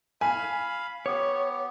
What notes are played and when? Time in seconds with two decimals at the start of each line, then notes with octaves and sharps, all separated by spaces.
0.21 F5 G#5 B5
1.06 B3 G4 C#5